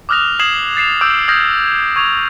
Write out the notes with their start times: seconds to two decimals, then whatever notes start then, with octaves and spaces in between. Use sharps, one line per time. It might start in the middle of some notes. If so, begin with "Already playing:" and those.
0.09 D6 D#6 F6 F#6 A#6 F7
0.40 D#6 G#6 C7 E7 F#7
0.77 A6 C7 E7 F7
1.01 D6 E6 F6 G6 D7
1.28 D#6 F6 G6 G#6 A#6
1.96 C#6 G#6 F7